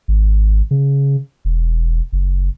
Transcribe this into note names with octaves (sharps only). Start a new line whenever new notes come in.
G#1
C#3
E1
F#1